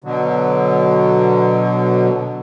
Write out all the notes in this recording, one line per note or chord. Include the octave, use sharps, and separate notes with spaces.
B2 D3 F#3